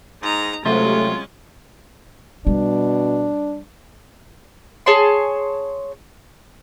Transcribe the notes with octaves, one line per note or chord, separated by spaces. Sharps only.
G#2 D#4 A#5
C3 F#3 G#3 A3 C#4 F4
B2 G3 D4
G#4 C#5 A5 C6